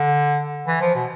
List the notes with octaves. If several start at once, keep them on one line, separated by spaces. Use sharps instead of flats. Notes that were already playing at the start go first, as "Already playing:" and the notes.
Already playing: D3
E3
F3
B2